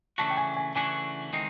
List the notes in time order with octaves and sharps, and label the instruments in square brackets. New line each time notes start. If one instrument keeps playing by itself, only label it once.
[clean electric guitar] C#3 E3 A3 D4 F#4 [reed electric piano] A5
[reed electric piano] G5
G#5
G#5
[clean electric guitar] C#3 E3 A3 D4 F#4 [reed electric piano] G#5
[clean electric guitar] D#3 G#3 C4 D#4